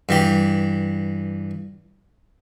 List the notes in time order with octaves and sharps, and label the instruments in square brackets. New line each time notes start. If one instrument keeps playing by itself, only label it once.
[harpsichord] G2 E3 G4